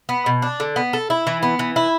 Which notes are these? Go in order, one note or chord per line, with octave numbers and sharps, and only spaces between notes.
B3
B2
D4
D3
B3
A4
E4
E3
B3
E3
E4